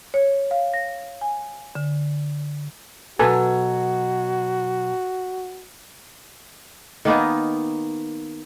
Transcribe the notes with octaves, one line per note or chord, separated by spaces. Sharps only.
C#5
F5
A#6
G#5
D3
B2 F#3 F#4 A4 B4 G#5
D#3 A#3 B3 D#4